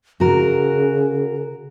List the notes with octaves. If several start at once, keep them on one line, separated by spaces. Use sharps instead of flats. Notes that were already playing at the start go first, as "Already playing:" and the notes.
C#3 F#4 A#4